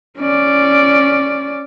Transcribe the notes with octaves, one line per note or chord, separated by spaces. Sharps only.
C#4 D5